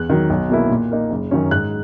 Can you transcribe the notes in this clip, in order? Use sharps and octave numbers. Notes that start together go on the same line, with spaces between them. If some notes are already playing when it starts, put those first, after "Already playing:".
Already playing: E2 F#6
D#3 F#3
B1
B2 A#3 E4
A#2
A#3 D#4
F#1
F#2 D#3 F#3 C#4
G#2 F#6